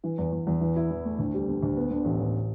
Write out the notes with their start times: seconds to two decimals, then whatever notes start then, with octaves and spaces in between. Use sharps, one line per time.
0.04 E3
0.18 E2
0.32 E2
0.47 E2
0.61 E3
0.76 E4
0.91 E3
1.05 A3
1.19 D2
1.34 G3
1.48 D3
1.63 D2
1.77 B3
1.90 D3
2.05 A1
2.20 A1